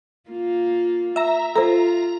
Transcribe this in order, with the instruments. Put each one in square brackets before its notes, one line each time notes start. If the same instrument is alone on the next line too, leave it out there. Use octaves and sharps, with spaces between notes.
[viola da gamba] A#3 F4
[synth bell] E5 A#5
[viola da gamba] F4 [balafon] A4 C5 [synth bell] A#5